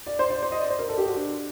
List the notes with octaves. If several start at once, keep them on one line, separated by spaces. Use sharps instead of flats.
D5
C5
D5
C5
D#5
D5
C5
A#4
A4
G4
F#4
D4